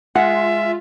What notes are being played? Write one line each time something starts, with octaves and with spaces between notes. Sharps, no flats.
G#3 F4 E5 F#5